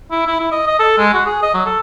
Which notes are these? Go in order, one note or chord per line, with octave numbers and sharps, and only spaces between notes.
E4
E4
E4
D#5
D#5
A4
G#3
F#4
G#4
D#5
F#3
A4